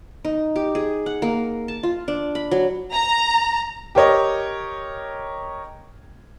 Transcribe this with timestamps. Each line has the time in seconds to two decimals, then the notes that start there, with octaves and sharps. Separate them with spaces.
0.25 D#4
0.56 G4
0.75 G#4
1.06 F#5
1.22 A#3
1.68 A5
1.83 F4
2.08 D4
2.35 B5
2.51 F#3
2.94 A#5
3.95 G4 A#4 C#5 D#5